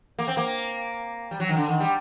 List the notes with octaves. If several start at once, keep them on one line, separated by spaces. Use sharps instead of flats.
A#3
C4
A#3
G3
F#3
D#3
D3
D#3
G3